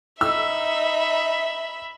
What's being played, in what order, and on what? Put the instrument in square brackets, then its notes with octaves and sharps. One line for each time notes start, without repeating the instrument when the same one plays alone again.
[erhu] D#4 [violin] E5 B5 [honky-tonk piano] E6